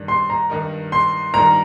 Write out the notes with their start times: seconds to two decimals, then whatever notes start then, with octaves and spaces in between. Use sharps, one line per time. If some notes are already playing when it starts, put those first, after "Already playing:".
Already playing: G2 D#3 G3
0.08 C6
0.30 A#5
0.50 G2 D#3 G3 D#4 A#4
0.92 C6
1.34 G2 D#3 G3 D#4 A#4 A#5